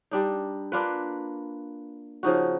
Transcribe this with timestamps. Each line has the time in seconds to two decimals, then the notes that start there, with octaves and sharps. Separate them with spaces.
0.11 G3 D4 D#4
0.72 A#3 D4 F4 B4
2.23 C#3 F3 D#4 F#4